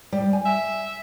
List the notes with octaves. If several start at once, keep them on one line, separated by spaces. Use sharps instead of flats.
G3
G#5
E5